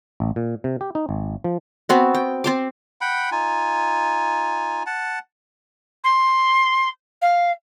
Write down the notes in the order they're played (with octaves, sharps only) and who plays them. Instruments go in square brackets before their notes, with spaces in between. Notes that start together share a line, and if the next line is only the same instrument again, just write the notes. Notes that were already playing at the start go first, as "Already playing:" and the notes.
[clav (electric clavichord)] A1
A#2
C3
G4
D#4
G#1
F3
[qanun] B3 C4 F#4
G5
C4 C5 D6
[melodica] F#5 G5 B5
D#4 F4 G#5
F#5 A5
[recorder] C6
F5